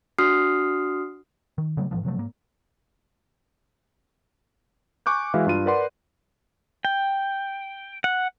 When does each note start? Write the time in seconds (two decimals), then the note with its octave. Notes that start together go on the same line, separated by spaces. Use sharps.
0.19 D4 F#4 D#6 F6 C7
1.58 D#3
1.77 C#3 F#3 G3 A3
1.91 G#2 C#3 E3 F3
2.05 C3 F3 F#3 A3
2.18 G#2 A#3
5.06 G#5 C#6 D6 F#6 G6
5.34 E3 G#3 E4 F#4 F5
5.47 G2 F4 D#7
5.66 A#4 B4 D5 F#5 C6
6.85 G5
8.04 F#5